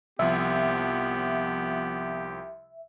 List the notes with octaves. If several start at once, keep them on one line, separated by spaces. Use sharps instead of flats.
C2 F3 B3 G4 E5